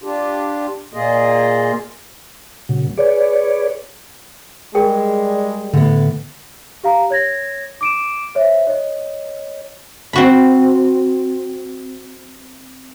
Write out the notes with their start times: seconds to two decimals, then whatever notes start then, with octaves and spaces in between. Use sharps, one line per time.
0.03 D4 F4 G4
0.94 A#2 A#3 F4 G#4 D#5
2.69 A#2 C#3 F#3
2.98 G#4 B4 C#5 D5
4.75 G3 G#3 G#4 A#4 G5
5.73 A2 D3 B3
6.83 G4 F5 A#5
7.10 C#5 G#6 A#6
7.81 D6 D7 E7
8.35 C5 C#5 E5
8.67 C#5 D#5
10.13 C4 F#4 B5